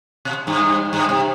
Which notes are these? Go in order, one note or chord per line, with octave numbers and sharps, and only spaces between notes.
B2
G2
G2
C3